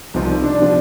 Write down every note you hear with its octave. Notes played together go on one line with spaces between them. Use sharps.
C2 C3 F3 D#4
D4
C3 F3